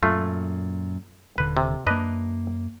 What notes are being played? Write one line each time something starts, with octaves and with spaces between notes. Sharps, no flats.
F#2 A#2 A3 F4
D#1 D3 B4
C3
F#2 A#3 D4 B4 D#5